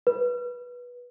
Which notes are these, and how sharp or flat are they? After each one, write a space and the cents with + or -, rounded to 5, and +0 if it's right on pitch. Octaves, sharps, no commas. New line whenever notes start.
B4 -15